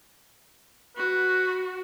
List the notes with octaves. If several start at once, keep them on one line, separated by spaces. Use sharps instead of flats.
F#4 B4